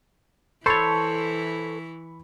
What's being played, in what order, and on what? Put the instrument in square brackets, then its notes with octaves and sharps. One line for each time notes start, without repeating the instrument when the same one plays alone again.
[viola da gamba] E3 E4 [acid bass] A4 [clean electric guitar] C5 C#5 [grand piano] B5 C#6